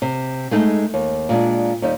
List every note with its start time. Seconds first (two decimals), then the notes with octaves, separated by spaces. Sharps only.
0.02 C3
0.51 G#3 A3 D#4
0.94 D#2
1.29 A#2 G#3 D4
1.82 D#2 G3 D#4